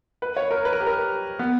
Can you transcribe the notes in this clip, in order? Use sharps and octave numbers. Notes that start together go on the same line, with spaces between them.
B4
C#5
A#4
B4
A#4
G4
A#4
B3